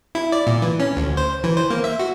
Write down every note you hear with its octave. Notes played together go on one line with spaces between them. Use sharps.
E4
D5
A#2
E3
C#4
D2
C5
E3
C5
A#3
E5
F#4